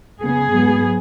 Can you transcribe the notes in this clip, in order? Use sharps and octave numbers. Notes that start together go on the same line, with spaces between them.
C#3 B3 G#4
G#2 F#3 B3